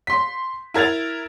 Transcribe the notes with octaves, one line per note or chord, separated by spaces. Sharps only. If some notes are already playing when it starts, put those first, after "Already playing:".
C6 B6
E4 A#4 G#6 A6 F7